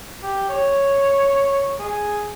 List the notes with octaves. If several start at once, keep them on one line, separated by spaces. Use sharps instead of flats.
G4
C#5
G#4